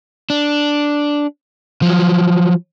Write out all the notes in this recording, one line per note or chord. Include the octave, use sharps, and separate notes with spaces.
D4
F3 F#3